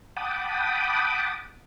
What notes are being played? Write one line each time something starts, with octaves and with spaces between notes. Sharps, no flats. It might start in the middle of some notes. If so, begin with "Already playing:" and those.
F#5 G5 A5 B5 D6 D#6